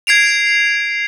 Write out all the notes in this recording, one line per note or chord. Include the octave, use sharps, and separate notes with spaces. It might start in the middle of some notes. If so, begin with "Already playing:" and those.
G#6 C7 D7 F7